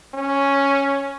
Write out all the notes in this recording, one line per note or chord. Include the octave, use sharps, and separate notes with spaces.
C#4